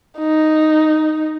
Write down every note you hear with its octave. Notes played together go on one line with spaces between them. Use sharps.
D#4